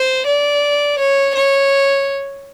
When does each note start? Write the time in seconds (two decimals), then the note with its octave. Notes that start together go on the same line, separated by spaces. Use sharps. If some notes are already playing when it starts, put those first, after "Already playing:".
Already playing: C5
0.26 D5
0.98 C#5
1.35 C#5